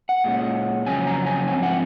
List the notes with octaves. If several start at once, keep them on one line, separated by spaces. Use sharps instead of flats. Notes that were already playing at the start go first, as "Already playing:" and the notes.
F#5
A#2 G#3 C#4
F2 C#3 F#3 C#4 G#5
A#5
G#5
G#2 F3 C4 G#5
F#5